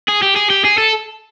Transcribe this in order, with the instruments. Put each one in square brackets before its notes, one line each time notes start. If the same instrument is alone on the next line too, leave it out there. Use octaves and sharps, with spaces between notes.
[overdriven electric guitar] G#4
G4
G#4
G4
G#4
A4